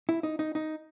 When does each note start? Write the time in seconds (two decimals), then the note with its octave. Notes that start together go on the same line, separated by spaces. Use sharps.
0.09 E4
0.23 D#4
0.39 D#4
0.55 D#4